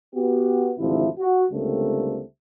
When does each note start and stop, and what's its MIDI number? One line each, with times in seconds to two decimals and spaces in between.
0.14 0.71 59
0.14 0.71 66
0.14 0.71 67
0.77 1.06 32
0.77 1.06 38
0.77 1.06 48
0.77 1.06 53
0.77 1.06 64
1.19 1.43 66
1.51 2.22 37
1.51 2.22 50
1.51 2.22 55
1.51 2.22 57
1.51 2.22 58
1.51 2.22 60